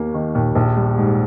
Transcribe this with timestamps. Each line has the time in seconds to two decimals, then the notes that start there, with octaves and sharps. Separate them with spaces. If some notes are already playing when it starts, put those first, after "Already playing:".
Already playing: D#2 A#3
0.14 D#3
0.35 D#2 A#2
0.55 A#1 A#2
0.77 G3
0.98 G#2